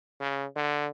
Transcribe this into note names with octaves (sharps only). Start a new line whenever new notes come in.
C#3
D3